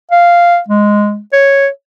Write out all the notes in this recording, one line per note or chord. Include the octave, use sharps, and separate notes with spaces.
F5
G#3
C#5